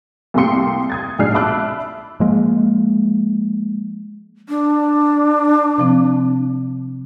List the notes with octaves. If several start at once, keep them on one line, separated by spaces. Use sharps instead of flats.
C2 A3 A#3 G4 C6 C#7
D#6 G#6 A6
B1 A#2 G#3 D4 F6 C7
E5 A5 B5 D6 E6 F#6
F3 G#3 A#3
D4
C3 F3 C4